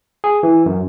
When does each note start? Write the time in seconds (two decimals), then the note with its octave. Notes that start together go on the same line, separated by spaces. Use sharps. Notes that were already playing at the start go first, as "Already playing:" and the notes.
0.24 G#4
0.43 E3
0.66 F#2